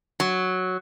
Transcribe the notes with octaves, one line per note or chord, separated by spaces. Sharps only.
F#3